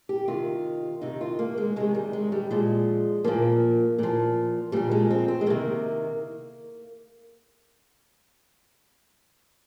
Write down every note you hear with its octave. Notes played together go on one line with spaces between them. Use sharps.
G4
C3 D#3 F4
C3 D#3 D#4
F4
A#3
G#3
C3 D#3 G#3
G3
G#3
G3
A#2 F3 G#3
A#2 F3 A#3
A#2 F3
A#2 F3 G3
G#3
C4
C4
G#3
C3 D#3 A#3